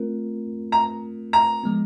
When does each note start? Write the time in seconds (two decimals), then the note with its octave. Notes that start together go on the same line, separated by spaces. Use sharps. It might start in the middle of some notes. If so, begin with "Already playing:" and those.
Already playing: A3 C4 F4 A#4
0.72 A#5
1.33 A#5
1.64 F3 G#3 B3